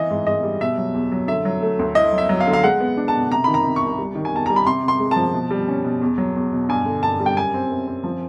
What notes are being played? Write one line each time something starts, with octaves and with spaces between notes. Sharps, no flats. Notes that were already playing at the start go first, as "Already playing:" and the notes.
Already playing: E3 D#5
G#2
G#2 D#5
G3
B2 E5
F#3
E2
F#3
D3 E5
F#3
A3
D2
E4 D#5
F#3
E5
F#3
F5
D3
F5
G#3 F#5
B3
D4
A5
B2
C3 A#5
D#3 B5
A#5
C3
C2 C#6
G3
D#3
G#5
E2 A5
G3 A#5
B5
C3 C6
C3 C6
G#3
A5
F3
B2
G3
C#4
B2
E2
F#3
E2
B2
G2 G#5
D3
G2 A5
G3
G5
F#2 G#5
C4
F#2
C4
F3